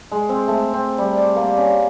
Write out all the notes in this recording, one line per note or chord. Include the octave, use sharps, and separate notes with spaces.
G#3
C4
A3
C4
G3
D5
A#3
C#4